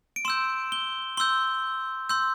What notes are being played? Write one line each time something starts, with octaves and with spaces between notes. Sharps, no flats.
D7
C6 E6 G6 E7
G7
C6 E6 G6 G7
C6 E6 G6